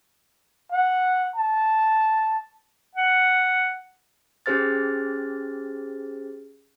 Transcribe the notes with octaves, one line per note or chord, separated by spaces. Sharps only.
F#5
A5
F#5
C#4 G4 G#4 C5 F6 A6